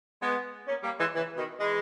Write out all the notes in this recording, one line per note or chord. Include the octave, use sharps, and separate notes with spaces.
G#3 B3
A#3 C#4
G3 A#3
E3 G#3
C#3 E3
B2 D#3
E3 G#3